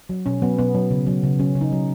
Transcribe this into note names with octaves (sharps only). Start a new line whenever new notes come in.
F#3
B2 C#4
F#3 B3
B2 B3
F#3
C#3
F#3
C#3
F#3 C#4
C#3
D#4
F#3